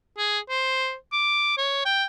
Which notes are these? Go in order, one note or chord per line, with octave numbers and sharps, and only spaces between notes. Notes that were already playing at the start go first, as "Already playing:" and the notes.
G#4
C5
D6
C#5
G5